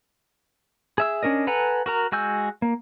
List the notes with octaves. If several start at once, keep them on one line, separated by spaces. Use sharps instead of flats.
G#4 E5 E6
C#4 D4 A#4 D#5
A4 B4 F#5 G#5 A#5
F#4 A#4 A#5
G#3 F#4 G#5 E6 G6
A#3